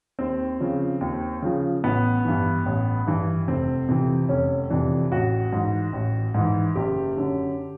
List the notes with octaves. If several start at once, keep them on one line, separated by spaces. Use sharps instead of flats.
D#2 C4
C#3 F3
D#2
C#3 F3
A1 B3
G2 E3
A1
G2 E3
F1 C4
F2 C3 E3
F1 C#4
F2 C3 E3 D4
A1 F#4
G#2 E3
A1
G#2 E3
F#1 G4
F#2 D3